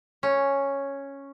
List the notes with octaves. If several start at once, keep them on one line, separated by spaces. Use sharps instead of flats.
C#4